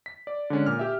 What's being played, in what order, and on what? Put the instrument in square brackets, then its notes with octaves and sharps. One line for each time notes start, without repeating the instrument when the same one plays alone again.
[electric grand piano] B6
D5
D3 G#3 C#4 D4
A#2 F6
G4 E5